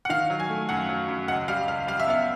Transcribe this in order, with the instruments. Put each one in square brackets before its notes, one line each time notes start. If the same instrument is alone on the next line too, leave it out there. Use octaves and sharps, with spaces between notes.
[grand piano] F#5
D#3 F5
F#3
G#5
A3
F#2 F#5
F#3
F#2
C#2 F#5
G3 F5
C#2 F5
G3 F5
E5
B3 F5